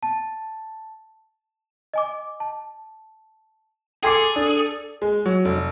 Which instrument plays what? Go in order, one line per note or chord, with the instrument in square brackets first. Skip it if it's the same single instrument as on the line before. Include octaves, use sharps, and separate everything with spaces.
[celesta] A5
D#5 G#5 D6
A5
[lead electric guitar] G#4 [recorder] A4 [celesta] G5 G#6 C7 [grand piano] G#5 C6 D6
[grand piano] D4
[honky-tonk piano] G#3
F#3
F1